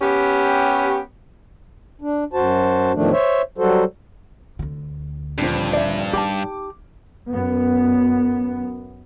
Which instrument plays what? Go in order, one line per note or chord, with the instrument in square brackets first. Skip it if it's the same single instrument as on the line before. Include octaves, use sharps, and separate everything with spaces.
[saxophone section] B3 C#4 G4
[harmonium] D4
F#2 F#4 C5 A5
E2 A2 D#3 F3 A3 D4
C5 C#5 E5
F#3 G3 F#4 A4 C5
[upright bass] D2 D3
[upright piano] D#1 F3 [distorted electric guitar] G2
[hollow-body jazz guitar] D5 E5
[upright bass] D#4 [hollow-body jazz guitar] G4 G5 A5 [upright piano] D6
[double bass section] F#2 B3